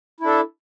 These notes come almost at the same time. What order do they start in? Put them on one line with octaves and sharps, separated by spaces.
E4 D4 A4